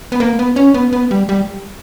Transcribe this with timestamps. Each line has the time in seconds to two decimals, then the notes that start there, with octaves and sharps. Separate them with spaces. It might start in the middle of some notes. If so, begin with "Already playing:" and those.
0.12 B3
0.20 A#3
0.39 B3
0.56 C#4
0.74 B3
0.93 B3
1.11 G3
1.29 G3